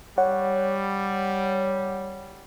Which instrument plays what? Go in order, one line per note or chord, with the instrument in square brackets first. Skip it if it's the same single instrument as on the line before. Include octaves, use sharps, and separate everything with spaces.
[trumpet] G3 [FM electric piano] C#5 F#5